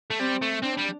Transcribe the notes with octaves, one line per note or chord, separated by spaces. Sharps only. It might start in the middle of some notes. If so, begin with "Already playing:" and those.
A3
G3 C4
A3
C4 D4
G3